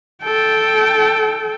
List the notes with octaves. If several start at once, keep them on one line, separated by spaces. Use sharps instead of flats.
A4 G5